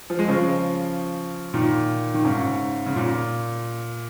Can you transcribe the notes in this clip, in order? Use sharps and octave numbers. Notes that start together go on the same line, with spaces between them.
F3
G#3
C#3 F3
A#2 D#3
D#3
G#2 C#3
C#3
A#2